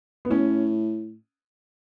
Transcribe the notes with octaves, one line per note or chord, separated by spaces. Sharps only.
B3
A2 C#4